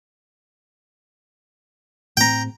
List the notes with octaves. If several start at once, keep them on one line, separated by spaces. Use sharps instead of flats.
A2 C4 G5 A#5